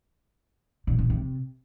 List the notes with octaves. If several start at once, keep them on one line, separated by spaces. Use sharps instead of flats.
B2
B2
C3